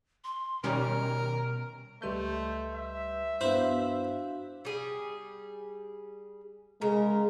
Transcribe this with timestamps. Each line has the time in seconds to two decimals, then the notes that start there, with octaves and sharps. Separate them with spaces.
0.24 C6
0.64 B2 D#3 G3 C#4 A#4 A#5
2.02 C#2 G3 A3 B4 D#5 C6 G6
2.75 E5
3.41 G2 B3 D4 E4 F#4 C5 F5
4.65 G3 G#4
6.81 C#3 G#3 A#4